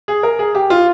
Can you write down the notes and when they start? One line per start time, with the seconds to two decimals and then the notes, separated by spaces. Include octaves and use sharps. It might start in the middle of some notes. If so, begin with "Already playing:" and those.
0.08 G#4
0.23 A#4
0.39 G#4
0.55 G4
0.70 F4